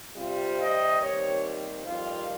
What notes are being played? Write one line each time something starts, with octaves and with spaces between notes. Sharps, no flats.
C3 G3 C4 F4
D#5
D#2 D#3 G3 C4 C#5
F2 D#3 G3 C4 F4